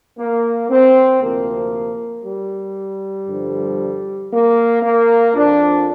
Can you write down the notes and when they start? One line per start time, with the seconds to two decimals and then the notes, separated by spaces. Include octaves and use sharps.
0.18 A#3
0.70 C4
1.21 D2 C3 F3 A#3
2.25 G3
3.28 G2 D3 F3
4.31 A#3
4.82 A#3
5.34 F2 F3 D4